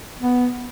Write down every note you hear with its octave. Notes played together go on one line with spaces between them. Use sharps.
B3